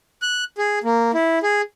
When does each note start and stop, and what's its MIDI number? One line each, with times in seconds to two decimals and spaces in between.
0.22 0.44 90
0.58 0.79 68
0.84 1.11 58
1.14 1.39 64
1.43 1.62 68